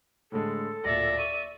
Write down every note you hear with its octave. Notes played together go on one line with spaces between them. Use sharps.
A2 D3 G#3 A4
D1 A#2 D5 E5 A#6
C#6 D#7